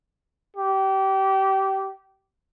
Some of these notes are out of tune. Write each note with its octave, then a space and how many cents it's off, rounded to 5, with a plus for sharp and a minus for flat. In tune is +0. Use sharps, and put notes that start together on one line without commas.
G4 -25